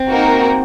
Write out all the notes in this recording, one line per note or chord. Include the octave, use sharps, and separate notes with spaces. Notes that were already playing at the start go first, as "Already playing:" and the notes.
Already playing: C4
A#3 D#4 F#4 A#4